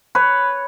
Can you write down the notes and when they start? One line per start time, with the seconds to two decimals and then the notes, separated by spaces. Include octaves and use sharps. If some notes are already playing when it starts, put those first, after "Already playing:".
0.15 B4 C#5